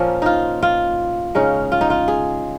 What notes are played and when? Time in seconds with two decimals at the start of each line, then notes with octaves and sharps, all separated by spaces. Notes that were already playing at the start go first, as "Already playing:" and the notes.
Already playing: A#2 F3 A#3 C#4
0.22 D#4 F4
0.63 F4
1.35 C#3 G#3 C#4 D#4
1.72 F4
1.81 D#4
1.90 F4
2.08 G#4